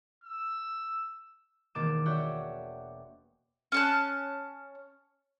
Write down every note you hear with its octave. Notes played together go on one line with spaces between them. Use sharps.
E6
E1 D#3 A#3 D6 A6 E7
F#4 C#5 D5 E5 F#5 G5
C#4 A5 F#6